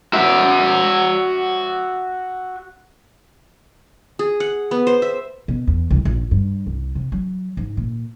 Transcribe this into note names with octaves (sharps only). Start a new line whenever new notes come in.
F#4 E5
G#4
F#5
B3
C5
E5
B2
E2
C2
A#1
G2
C2
C3
F#3
G#2
A#2